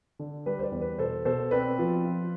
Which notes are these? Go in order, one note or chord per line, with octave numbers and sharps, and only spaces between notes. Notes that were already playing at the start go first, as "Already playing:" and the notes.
D3
G3 B4
C5
B4 D5
E2
B4
B2 A4 C5
B2 A4 C5
C4 B4 D5
F3
F4